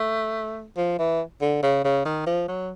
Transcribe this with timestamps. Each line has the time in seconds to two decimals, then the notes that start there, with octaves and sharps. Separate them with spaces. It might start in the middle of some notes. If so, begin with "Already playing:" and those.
Already playing: A3
0.77 F3
0.99 E3
1.41 D3
1.63 C#3
1.85 C#3
2.05 D#3
2.27 F3
2.48 F#3